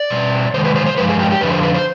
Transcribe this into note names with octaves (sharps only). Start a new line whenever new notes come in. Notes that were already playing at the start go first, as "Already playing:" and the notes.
Already playing: D5
B2 G3
C3 D#3 G#3 C5
B4
C5
C5
G2 F3 G#3 B4
G#4
G4
G4
F2 D3 F3 B4
C5
B4
C5